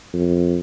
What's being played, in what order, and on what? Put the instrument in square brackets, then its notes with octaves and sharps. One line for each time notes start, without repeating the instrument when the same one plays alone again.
[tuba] F2